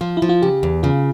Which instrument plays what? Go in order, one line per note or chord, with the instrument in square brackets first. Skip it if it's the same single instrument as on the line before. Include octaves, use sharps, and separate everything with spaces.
[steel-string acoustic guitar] F3 [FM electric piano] F4
[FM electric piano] E4
[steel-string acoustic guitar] F3
[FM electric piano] F4
[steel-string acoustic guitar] C#3 [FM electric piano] G4
[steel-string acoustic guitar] E2
[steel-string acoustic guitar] C#3 [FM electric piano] F4